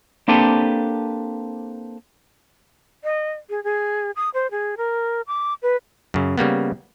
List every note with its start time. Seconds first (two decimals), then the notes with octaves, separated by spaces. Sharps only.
0.28 A#3 C4 D4 G4 A4 B4
3.04 D#5
3.50 G#4
3.64 G#4
4.16 D#6
4.34 C5
4.51 G#4
4.77 A#4
5.27 D6
5.62 B4
6.14 F#2 C#3
6.38 C#3 G3 A#3 B3